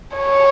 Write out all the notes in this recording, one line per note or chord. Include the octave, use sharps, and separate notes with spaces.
C#5